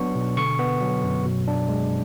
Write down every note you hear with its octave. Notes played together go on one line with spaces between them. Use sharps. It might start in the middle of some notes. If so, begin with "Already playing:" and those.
Already playing: F#3 B3 D4 C#6
B2
D3 C#6
B3
F#3
F#2
B2
D4
G#3